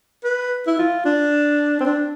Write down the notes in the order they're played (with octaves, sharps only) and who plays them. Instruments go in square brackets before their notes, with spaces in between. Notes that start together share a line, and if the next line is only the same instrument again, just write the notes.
[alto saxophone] B4
E4
F4
D4
C4
D4